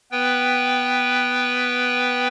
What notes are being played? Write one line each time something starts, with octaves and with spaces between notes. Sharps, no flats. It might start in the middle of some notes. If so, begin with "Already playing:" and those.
B3 B4 G5